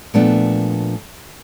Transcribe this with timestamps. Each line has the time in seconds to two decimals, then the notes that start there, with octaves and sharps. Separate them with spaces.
0.14 A#2 F3 A3 B3 D4